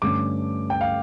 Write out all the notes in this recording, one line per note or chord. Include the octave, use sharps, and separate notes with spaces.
G2 D3 A3 C#4 D6
G5
F5